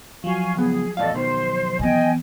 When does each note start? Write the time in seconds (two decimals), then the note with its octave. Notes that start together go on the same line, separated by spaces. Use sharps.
0.24 F3 F#3 F5 G#5 C#6
0.56 C#2 B3 G#4
0.97 E2 A2 A4 D5 D#5 F5
1.14 B2 D#3 C5
1.79 E3 B3 D#5 G5 G#5